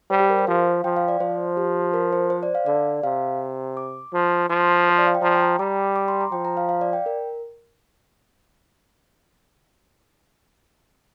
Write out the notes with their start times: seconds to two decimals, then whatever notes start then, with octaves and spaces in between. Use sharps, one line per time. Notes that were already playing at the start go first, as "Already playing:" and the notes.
0.11 G3 C5
0.20 G4
0.30 A#4
0.39 C5
0.47 F3 F5
0.84 F3 G5
0.96 F5
1.08 D5
1.20 F3 C5
1.57 G4
1.94 A#4
2.13 C5
2.30 C5
2.43 D5
2.55 F5
2.66 D3 D5
3.03 C3 F5
3.77 D6
4.14 F3
4.49 F3 C6
4.90 C5
4.98 D5
5.07 F5
5.15 G5
5.22 F3 A#5
5.35 G5
5.41 A#5
5.59 G3 D6
5.96 D6
6.08 C6
6.21 A#5
6.32 F3 G5
6.45 A#5
6.57 F5
6.69 F5
6.81 D5
6.93 G5
7.06 A#4